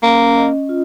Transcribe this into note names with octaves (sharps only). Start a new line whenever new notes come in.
A#3 C#4
D#5
F4